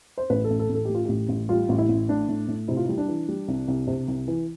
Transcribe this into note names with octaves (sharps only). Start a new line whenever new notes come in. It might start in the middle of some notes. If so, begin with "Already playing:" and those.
C5
A1 B4
A4
A1
A4
A1
A4
A2 G4
F4
A1 G4
A1
G3 F4
A1
E4
A1
A2 D4
A2
A2
C3 E4
F4
E4
G3
D4
E3
G3
C2
C2
C3
C2
E3